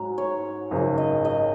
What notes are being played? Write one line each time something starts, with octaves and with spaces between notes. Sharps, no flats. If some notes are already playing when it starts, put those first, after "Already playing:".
Already playing: G#2 F#3 C#4 F#4 A#5
C#5
G#1 F#2 C#3
D#5
D#5